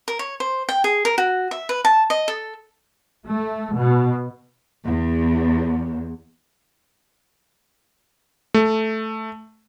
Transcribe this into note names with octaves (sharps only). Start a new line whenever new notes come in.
A#4
C#5
C5
G5
G#4
A#4
F#4
E5
B4
A5
D#5
A4
A3
B2
E2
A3